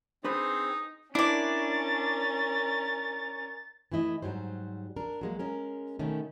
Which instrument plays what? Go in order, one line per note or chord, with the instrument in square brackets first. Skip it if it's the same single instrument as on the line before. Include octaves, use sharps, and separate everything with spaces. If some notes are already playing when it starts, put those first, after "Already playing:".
[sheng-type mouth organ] C4 G#4 [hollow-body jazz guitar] D4 B4 B5 [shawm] D#4 [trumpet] C5
[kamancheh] C#4 A#4 [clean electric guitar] D4 [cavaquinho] E4 D5 [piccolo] A6
[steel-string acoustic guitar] E3 A3 E4 D#5
G#2 F#3 G3 C5
D4 A#4
F#3 G#3 A#3
G#3 C#4 A#4
B2 D#3 A3 C#4